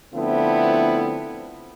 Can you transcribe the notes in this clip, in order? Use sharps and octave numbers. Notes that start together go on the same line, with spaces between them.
D3 F3 A3 B3 C4 E4